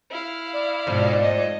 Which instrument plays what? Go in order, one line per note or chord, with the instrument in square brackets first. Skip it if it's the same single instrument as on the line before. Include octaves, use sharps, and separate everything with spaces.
[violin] E4 F5
[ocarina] D5
[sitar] F2 [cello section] G#2 B2
[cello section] A3 [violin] D#5